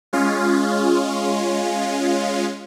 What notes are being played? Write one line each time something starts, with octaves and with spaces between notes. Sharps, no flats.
G#3 C#4 F4